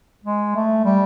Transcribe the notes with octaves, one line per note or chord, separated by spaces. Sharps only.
G#3
A3
G3